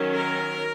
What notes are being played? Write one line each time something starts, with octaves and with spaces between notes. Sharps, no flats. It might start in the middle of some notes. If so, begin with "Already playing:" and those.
Already playing: D#3 F#3 C#4
A#4